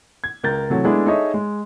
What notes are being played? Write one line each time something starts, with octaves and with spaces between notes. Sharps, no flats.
G#6
C#2 A#4 G6 A6
C3 E3 F#3 A3
G#3 A3 B3 D4 E4 G#4
D#4 G#4 A4 C#5 D#5 E5
G#3